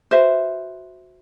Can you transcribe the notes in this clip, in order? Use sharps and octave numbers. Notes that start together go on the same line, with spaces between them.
F#4 B4 C5 E5